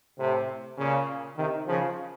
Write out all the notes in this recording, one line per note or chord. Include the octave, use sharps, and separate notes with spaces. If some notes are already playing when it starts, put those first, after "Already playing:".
A2 C3
A#2 C#3
C3 D#3
C#3 F3